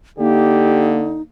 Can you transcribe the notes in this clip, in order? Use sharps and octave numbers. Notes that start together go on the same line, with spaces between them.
D3 A#3 D#4 G4